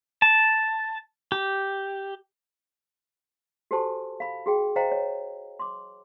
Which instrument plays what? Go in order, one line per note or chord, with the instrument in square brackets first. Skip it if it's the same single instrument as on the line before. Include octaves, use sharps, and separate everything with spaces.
[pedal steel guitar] A5
G4
[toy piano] F#4 G4 A4 C5 G#5 A5
F5 B5
F#4 G#4 G5
C5 D#5 F5 G5 A#5
C#5
C6 D6